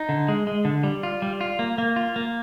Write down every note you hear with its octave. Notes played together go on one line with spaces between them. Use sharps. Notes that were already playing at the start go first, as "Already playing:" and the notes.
Already playing: D#4
D3
G#3
G#3
D3
G3
F4
G3
F4
A#3
A#3
F4
A#3